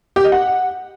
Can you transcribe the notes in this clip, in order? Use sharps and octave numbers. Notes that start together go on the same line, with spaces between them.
G4
D#5
F#5